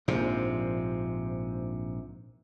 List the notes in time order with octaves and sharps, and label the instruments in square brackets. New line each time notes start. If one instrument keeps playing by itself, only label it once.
[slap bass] A#1 G#2 C3 F3